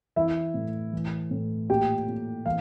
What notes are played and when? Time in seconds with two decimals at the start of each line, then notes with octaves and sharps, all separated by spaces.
0.16 E3 E4 E5
0.54 A2
0.93 E3
1.31 A2
1.69 A#2 G4 G5
2.08 A#2
2.46 E3 F5